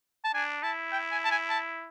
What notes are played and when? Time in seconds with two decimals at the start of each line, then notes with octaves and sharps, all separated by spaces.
0.24 A5
0.34 D4 G#5
0.63 E4 A5
0.92 G5
1.11 G#5
1.25 A5
1.31 G#5
1.50 A5